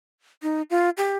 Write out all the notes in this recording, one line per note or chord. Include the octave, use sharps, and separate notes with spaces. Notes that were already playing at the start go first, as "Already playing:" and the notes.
D#4
F4
G4